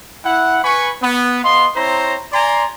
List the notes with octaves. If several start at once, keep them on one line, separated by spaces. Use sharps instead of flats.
E4 F#5
B4 G#5 B5 C#6
B3
B3 D#5 F5 C6
C4 E4 C5 C#5 A#5
D5 G#5 A#5 C6